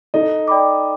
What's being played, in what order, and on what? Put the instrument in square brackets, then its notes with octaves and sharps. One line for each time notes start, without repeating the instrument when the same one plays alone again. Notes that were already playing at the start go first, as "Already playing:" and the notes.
[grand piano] D#4 D#5 [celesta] A4
[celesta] D5 G5 B5 D6